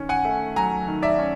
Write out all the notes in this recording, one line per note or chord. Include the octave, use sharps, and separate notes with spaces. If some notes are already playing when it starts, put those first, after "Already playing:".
Already playing: D#3 C#4
F#5 G#5
A3
F#3 G#5 A#5
D#3
D5 E5
C#4